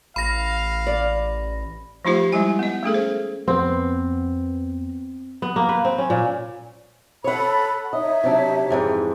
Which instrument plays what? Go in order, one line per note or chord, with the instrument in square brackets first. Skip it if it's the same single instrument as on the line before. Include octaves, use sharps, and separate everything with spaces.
[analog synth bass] A1 [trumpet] F5 [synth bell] B5 A#6
[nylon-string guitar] D5
[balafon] F3 A3 D#4 F4 G4 C5
G3 G#3 E4 G#5
B3 D#5
A3 C#4 G#4 A4
C5
[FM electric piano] F2 B3 [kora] C4
[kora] B3
A#3
B4
C4
C#4
A#2
[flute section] A4 B5 [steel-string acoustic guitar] C#5 F#5
[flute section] D#4 C#5 E5 [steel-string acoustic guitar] D#5
[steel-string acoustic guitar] C3 F#3 D4
F2 G#2 E3